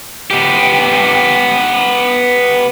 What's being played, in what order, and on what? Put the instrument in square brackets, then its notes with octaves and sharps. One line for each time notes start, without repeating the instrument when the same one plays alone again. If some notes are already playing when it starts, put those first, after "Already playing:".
[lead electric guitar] B3 G4